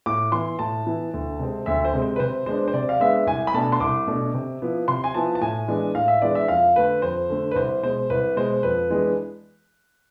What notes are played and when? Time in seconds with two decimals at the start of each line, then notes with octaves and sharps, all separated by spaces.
0.06 A2 D6
0.32 E3 B3 E4 C6
0.59 A2 A5
0.86 E3 B3 E4
1.14 D2
1.39 C3 G#3 C4
1.66 D2 E5
1.85 C5
1.94 C3 G#3 C4
2.02 C5
2.16 B4
2.20 C3 C5
2.46 G#3 B3 D4 C5
2.68 C5
2.74 C3 D5
2.89 F5
3.00 G#3 B3 D4 E5
3.27 C2 G#5
3.47 B5
3.54 B2 A3 D4 A5
3.72 C6
3.80 C2 D6
4.07 B2 A3 D4
4.34 C3
4.62 F3 B3 E4
4.88 C3 C6
5.04 G#5
5.14 F3 B3 E4 A5
5.35 A5
5.41 A2 G#5
5.68 E3 G#3 B3 D4
5.95 A2 F5
6.08 E5
6.22 E3 G#3 B3 D4 D5
6.35 E5
6.48 F2 F5
6.76 D3 A3 B4
7.02 F2 C5
7.30 D3 A3
7.51 B4
7.56 C2 C5
7.83 B2 G#3 C5
8.10 C2 B4
8.36 B2 G#3 C5
8.63 F2 B4
8.90 E3 G#3 B3 D4